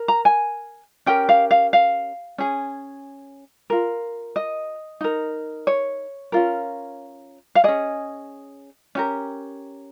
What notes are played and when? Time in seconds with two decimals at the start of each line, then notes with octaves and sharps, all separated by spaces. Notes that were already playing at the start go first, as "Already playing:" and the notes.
Already playing: A#4
0.08 A#5
0.25 G#5
1.06 C#4 G4 A#4 G5
1.29 F5
1.51 F5
1.73 F5
2.38 C#4 G#4
3.70 F4 A#4
4.36 D#5
5.01 D#4 A#4
5.67 C#5
6.32 C#4 F4 A#4
7.55 F5
7.64 C#4 G#4 D#5
8.95 C#4 G4 A#4